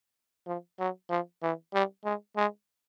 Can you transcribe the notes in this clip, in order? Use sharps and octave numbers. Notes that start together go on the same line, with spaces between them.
F3
F#3
F3
E3
G3
G#3
G#3